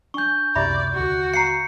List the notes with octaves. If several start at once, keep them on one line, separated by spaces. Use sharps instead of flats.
D4 G#5 C#6 G6
C#2 F#2 C3 E4 D5 E5 B5
D#2 D3 F#4
F5 A#5 C7 C#7